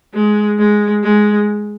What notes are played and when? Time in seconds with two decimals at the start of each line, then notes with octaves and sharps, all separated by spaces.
0.14 G#3
0.58 G#3
1.03 G#3